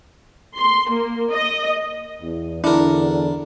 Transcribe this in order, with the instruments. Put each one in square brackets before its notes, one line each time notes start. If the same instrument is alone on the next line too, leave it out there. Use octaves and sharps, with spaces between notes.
[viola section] C6
A#3
D#5
[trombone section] E2
[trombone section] E2 D3 [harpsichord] D4 A#4 [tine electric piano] E4